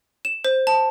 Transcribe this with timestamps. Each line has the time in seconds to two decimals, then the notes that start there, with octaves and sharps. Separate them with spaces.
0.25 E7
0.45 C5
0.67 A5